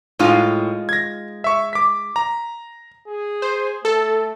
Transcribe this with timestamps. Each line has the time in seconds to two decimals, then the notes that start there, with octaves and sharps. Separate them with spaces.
0.19 A2 G#3 D#4 F4
0.89 G#6 A#6
1.44 E5 C#6
1.73 D6 B6
2.16 A#5
3.08 G#4
3.42 C5
3.85 A3 A4